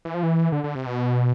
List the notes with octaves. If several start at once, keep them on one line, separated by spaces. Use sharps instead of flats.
E3
F3
E3
D3
D3
C3
B2